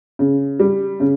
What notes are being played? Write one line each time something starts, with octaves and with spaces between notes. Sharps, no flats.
C#3
G3
C#3